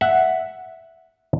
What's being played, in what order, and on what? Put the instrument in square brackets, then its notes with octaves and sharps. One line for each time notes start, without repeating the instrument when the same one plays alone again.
[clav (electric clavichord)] E5 F#5